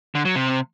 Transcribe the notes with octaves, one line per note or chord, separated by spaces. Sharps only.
D3
F#3
C3